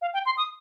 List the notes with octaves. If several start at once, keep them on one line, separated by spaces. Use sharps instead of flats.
F5
G5
C6
D#6